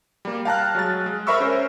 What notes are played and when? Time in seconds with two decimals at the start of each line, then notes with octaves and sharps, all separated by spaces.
0.25 G3 A#3
0.45 F5 G5 A5 A#5 F6 F#6
0.75 F#3 G#3 A6
1.06 G#3
1.27 A#4 C5 E5 B5 C#6 E6
1.40 C#4 A#4 C5